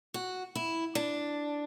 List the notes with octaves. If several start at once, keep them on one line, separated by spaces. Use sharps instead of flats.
F#4
E4
D4